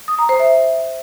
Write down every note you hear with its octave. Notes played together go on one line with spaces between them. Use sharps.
D#6
A#5
C5
E5